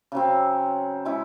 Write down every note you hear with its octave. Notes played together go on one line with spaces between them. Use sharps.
C#3 F#3 C4
G#3 C#4 E4